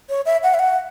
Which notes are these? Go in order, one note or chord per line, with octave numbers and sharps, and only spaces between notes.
C#5
E5
F#5
E5
F#5